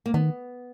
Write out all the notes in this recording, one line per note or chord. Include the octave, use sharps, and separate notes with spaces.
A#3
D#3 B3